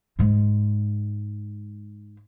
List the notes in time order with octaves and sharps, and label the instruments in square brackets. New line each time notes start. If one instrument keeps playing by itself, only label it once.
[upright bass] G#2 G#3